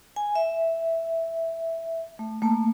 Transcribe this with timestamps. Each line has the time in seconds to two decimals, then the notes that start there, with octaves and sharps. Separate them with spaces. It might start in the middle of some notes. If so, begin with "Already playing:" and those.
0.16 G#5
0.35 E5
2.19 A3
2.42 A3 A#3 A5